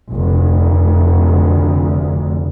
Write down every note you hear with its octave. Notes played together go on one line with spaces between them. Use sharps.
F1 D2